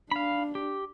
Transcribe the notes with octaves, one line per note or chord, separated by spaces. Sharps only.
D4 F5 B5
G4